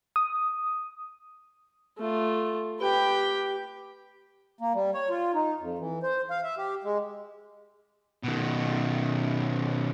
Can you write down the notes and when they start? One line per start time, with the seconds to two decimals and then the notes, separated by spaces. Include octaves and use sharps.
0.16 D#6
1.98 A3 F4
2.80 G4 B4 G5
4.61 A#3
4.74 G3
4.94 C#5
5.10 F4
5.34 D#4
5.60 F2
5.79 E3
6.03 C5
6.30 F5
6.43 E5
6.58 G4
6.84 G#3
8.24 B2 D#3